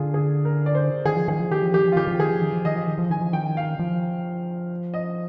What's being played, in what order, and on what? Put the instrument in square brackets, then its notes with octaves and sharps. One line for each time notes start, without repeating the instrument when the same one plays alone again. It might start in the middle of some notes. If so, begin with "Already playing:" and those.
Already playing: [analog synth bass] D3 [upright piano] F4 G#4
[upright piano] G#4
A#4
D5
C5
[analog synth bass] D#3 [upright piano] G#4
[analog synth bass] F3
[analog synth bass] D#3 [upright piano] G#4
[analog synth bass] F3
[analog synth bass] D#3 [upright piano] G4
[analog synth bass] F3
[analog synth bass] D#3 [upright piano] G4
[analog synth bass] F3
[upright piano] F4
[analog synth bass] D#3 [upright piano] G4
[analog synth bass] F3
[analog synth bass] D#3 [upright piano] G#4
[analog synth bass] F3
D#3
F3
[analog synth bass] D#3 [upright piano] D#5
[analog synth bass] F3
D#3
F3
[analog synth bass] D#3 [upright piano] G#5
[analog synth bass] F3
[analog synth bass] D#3 [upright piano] G5
[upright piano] F5
[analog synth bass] F3
[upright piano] D#5